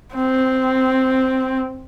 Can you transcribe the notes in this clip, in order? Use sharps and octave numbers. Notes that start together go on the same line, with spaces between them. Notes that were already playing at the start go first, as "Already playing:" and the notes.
C4